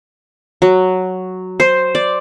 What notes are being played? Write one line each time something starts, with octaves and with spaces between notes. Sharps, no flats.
F#3
C5
D5